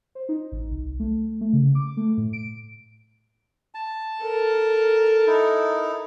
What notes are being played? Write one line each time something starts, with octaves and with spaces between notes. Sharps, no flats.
C5
D#4
A1
C2
A3
A3
C#3
D6
A3
A2
D7
A5
A4 A#4
D#4 E4